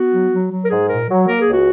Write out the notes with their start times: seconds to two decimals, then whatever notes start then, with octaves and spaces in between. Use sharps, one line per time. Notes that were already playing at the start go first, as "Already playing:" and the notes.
Already playing: B3 F#4
0.12 F#3
0.32 F#3
0.51 F#3
0.65 A#4
0.70 G#2 G#4
0.89 A#2 A#4
1.09 F#3
1.28 A#3 A#4
1.41 G#4
1.47 C#2
1.53 F#4